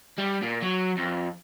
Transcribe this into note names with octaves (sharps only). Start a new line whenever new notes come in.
G3
A#2
F#3
F2